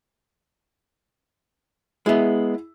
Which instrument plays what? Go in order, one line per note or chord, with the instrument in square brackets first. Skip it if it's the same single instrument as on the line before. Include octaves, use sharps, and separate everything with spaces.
[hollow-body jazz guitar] G#3 B3 [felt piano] E4 G#4 E5